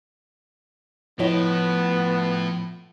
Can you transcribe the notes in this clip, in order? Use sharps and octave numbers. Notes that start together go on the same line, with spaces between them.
A2 F3 B3 E4 C#5 D#5